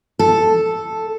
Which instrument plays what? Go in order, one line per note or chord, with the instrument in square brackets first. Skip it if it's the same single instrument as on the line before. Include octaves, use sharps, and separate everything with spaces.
[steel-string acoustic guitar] A4